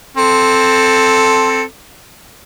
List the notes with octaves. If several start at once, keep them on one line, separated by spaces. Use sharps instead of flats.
C4 A4